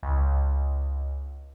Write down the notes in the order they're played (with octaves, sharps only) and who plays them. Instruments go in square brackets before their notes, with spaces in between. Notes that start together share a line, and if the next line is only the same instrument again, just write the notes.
[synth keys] C#2